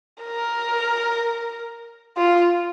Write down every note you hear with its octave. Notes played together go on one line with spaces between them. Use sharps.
A#4
F4